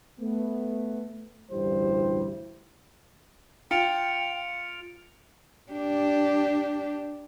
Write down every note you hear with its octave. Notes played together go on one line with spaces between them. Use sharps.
A3 B3
A1 D2 G2 G3 E4 C5
F4 G5 C#7 D7 F7
D4 G4